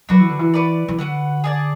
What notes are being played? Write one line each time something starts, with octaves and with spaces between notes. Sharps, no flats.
F#3 D4 F#4 B4
E3
D3
E3
F#4 B4 D5
E3
D3 F#4 B4 F#5
G#4 D5 A5